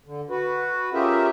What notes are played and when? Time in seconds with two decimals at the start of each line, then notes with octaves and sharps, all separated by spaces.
0.06 D3
0.30 F#4 B4
0.94 C#4 F4 G4 G#4 A#4 E5